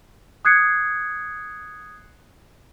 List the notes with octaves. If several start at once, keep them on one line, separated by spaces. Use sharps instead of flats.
D#6 F#6 G#6 C7 C#7